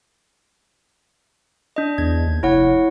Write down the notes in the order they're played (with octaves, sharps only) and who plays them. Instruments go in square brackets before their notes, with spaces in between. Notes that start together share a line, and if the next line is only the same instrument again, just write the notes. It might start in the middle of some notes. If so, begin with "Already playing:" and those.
[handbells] D4 D#5
[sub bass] E2 [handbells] G#6
[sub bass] D#2
[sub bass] F1 [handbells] E4 C#5 F#5